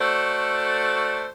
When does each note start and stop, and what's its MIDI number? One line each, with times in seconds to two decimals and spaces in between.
0.01 1.27 57
0.01 1.27 66
0.01 1.27 69
0.01 1.27 72
0.01 1.27 74